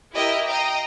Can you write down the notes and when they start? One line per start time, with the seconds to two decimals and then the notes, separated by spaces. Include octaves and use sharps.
0.15 E4 G4 A#4 D#5 E5 G5
0.47 D#5 F5 G5 A#5